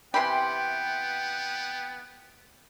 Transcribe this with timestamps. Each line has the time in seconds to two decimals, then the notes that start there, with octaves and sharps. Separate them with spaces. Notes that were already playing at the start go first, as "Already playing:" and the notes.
0.14 C3 E3 B3 G4 G5 B5 C6